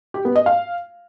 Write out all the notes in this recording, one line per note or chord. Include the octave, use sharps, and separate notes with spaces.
G4
B3
D#5
F5